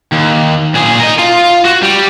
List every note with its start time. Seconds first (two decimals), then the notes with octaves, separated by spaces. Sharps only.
0.13 D#2
0.75 A#2 G#4
1.00 A#4 D#5
1.19 F4
1.65 F#4
1.82 G3